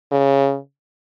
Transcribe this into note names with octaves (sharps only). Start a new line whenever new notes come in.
C#3